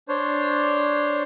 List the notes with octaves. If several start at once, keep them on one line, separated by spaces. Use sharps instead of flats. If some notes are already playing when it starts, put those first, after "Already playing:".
D4 C5 C#5